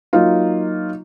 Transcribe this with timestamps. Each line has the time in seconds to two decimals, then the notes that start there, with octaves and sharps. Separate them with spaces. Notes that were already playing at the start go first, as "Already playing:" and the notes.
0.13 F#3 A#3 D#4 F4